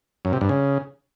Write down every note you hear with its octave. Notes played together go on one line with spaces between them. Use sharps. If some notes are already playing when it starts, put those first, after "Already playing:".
F#2
C3
G2
C#3